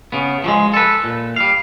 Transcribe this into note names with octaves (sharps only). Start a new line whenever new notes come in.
C#3 B3
F3 F#3 G#3
A4 B4
A#2
G3 F5